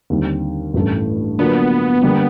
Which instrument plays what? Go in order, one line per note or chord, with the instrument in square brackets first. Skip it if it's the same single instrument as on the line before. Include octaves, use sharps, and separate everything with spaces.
[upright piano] D#2 D3 G3 C4
A1 G2 E3 A3
[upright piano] D3 F#3 A#3 D4 F4 [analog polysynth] B3
[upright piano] D3 G3 A#3